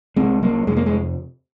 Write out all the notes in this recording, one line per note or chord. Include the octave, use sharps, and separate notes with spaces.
C2 C3 G#3 C4
F#3 A#3
F2 C3 G#3
A#3
G#3